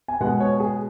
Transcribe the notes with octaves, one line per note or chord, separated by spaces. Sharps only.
G#5
B2 G#3 B3 F#5
C#5
G#4